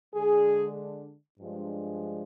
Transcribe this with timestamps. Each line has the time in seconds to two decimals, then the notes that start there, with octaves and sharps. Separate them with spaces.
0.15 D3 G#3 D4 G#4
1.39 G2 F3 G#3 D4